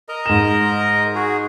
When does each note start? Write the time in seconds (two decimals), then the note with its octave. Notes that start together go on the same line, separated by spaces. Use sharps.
0.09 A#4 D#5 A#5
0.26 G#2 E7
1.15 F#4 G#4